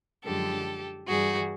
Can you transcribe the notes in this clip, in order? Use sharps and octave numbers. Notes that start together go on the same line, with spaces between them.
F#2 D3 F3 G#3 G4 A4
G2 E3 G3 F#4 G#4